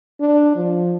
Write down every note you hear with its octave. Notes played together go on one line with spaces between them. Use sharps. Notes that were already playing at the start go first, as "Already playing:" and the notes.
D4
F3